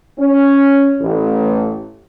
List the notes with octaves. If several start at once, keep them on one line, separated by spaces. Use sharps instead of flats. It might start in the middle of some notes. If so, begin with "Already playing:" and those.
C#4
A1